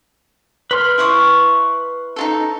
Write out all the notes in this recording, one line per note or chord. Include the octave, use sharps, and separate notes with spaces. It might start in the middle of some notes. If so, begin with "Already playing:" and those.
B4 C6 F6
E4 C#6 D#6
D#4 F4 A4